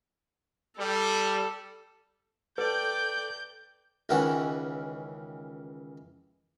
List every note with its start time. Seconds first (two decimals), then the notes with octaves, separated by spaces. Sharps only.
0.79 G3 A4
2.58 A4 B4 D5 G5 G6
4.09 C#2 D#3 E3 C#4 F#5